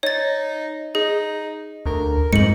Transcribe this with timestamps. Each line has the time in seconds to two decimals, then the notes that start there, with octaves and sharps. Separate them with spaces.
0.03 D#4 C#5 A6
0.95 D#4 G#4
1.86 D2 A#4
2.33 F2 G#2 D#4 C#7 F#7